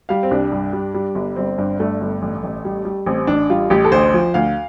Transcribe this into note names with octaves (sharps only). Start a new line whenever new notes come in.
G3 F5
C4
C2 D4
G2
G3
G3
G1
G1 C4
G2
G2 A3
G1
A1
A1
G3
G3
A1 C4
A1 D4
G3 F4
A1 G4
A4
D2 C5
F3
D2 F5